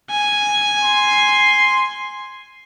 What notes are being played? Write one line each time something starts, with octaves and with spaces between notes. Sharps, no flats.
G#5
C6